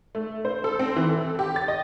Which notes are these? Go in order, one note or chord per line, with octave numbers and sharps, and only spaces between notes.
A3
C5
A4
C4
E3
A4
G4
A6
D#5